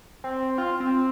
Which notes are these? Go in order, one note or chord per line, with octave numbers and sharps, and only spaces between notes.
C4
F4
C4